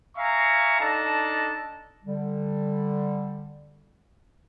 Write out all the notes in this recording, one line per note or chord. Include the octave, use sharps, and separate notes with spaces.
E5 F5 G#5 A#5 C#6
D4 D#4 A4 A5 A#5
D3 G3